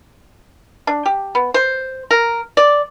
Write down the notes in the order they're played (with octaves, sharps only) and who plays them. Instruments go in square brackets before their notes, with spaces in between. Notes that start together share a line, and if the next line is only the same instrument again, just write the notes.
[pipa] D4
G4
B3
C5
A#4
D5